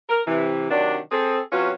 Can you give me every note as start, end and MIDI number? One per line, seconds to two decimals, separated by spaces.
0.09 0.22 70
0.27 0.67 48
0.27 0.67 52
0.71 0.98 48
0.71 0.98 51
0.71 0.98 54
0.71 0.98 62
1.12 1.40 60
1.12 1.40 68
1.12 1.40 69
1.52 1.71 48
1.52 1.71 54
1.52 1.71 61
1.52 1.71 65
1.52 1.71 66
1.52 1.71 71